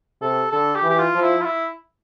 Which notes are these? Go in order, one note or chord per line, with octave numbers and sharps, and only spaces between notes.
C3 A4
D3 A4
G4
E3
G4
F4
F3
E4
F4
E4